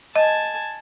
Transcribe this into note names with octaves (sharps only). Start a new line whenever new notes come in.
D#5 G#5 A5